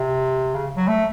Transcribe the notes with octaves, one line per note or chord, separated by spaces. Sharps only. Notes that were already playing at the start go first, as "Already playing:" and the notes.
Already playing: C3
C#3
F#3
A3